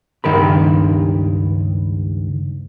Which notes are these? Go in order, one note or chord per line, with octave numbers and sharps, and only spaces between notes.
C#2 G2 D#3 A#4 B5